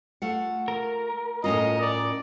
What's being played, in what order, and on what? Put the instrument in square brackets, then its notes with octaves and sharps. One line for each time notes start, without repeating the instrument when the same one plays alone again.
[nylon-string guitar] A3 F4 F#5
[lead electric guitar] A#4
[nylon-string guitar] A2 C#4 F4 [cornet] D#5
[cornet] D5